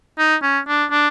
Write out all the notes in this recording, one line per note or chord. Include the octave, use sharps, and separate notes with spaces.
D#4
C#4
D4
D4